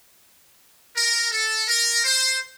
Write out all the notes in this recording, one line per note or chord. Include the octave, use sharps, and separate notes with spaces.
A#4
A4
A#4
C5